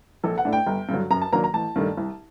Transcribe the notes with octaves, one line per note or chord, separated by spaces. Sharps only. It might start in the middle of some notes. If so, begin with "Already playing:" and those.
A#1 A4
F#5
A2 A3 D4
G5
G1
G2 D3 F#3
F#2 A#5
A5
D#3 F#3 A#3 D4 A#5
A#5
A1 A5
G2 D#3 A3 D4
C2